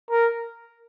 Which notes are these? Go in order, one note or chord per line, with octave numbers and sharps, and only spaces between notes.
A#4